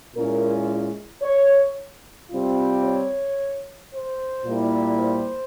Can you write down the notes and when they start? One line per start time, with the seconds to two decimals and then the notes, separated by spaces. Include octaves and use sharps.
0.15 A#2 G#3 C#4 E4 A#4
1.23 C#5
2.31 C3 G3 C4 F4
2.84 C#5
3.92 C5
4.46 A#2 G3 A#3 E4
4.99 C5